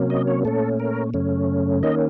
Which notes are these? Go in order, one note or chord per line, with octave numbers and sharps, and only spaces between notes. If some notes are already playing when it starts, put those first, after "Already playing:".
Already playing: C3 F#3 A#3 C#4
D#5
C#5
A#2 A3 C#4 A4
A#4
F#2 C#3 A3 C#4
D#3 A#3 C#4 D#5